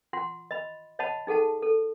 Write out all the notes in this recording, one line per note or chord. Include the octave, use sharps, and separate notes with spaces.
F4 F#5 C6
D#5 B5
C#5 D#5 F#5 A5 B5
D#4 G#4 A4 F#5 A5
A4